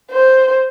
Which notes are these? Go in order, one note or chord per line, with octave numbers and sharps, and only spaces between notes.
C5